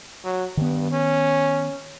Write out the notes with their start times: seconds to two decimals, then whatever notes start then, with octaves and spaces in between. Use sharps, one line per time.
0.24 F#3
0.57 G2 D#3 B3
0.91 C#4